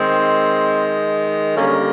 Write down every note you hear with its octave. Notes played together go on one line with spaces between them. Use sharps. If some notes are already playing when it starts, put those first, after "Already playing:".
Already playing: D#3 G#3 C4
D3 G3 A#3 C#4